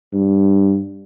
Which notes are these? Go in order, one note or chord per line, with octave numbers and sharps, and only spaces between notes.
G2